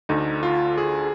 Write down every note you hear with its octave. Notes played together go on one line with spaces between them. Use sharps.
D2 D3 D#4
F4
G#4